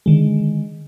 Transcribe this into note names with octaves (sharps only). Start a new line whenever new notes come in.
D3 D#3 G#3